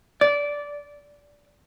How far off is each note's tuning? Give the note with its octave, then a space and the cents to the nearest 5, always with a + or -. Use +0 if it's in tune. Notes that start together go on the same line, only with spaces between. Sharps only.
D5 -15